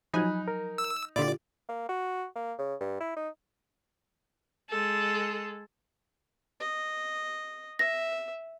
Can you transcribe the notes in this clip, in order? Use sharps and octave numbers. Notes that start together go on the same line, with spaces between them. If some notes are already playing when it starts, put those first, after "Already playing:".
F3 F#3 D#4 G#5 B5 F#6
A#4
E6
A#2 D3 E4 F4 G4 D5
A#3
F#4
A#3
C#3
G2
E4
D#4
G#3 A4
D#5
E5 A#6